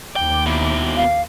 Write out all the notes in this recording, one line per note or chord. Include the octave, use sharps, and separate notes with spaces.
D#2 G5 D6
B2 E4
F5